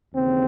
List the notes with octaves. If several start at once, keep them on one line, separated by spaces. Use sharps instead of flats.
D#2 C#3 E3 C4